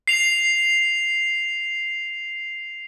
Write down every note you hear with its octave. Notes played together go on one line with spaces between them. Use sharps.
C7 F7